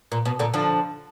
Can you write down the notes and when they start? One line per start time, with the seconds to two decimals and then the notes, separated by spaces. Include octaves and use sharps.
0.12 A#2
0.25 B2
0.39 A#2 D3
0.54 D3 F3